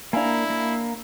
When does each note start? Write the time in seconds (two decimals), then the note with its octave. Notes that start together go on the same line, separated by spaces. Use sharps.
0.13 A#3 D4 E4 F5 G#5 A#5
0.50 A#3